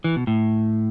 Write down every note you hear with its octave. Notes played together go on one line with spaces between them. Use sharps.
E3
B2
A2